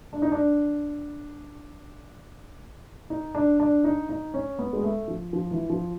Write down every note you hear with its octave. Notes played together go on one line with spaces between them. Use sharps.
D4
D#4
D4
D#4
D4
D4
D#4
D#4
C#4
B3
G#3
A3
F3
F3
E3
F3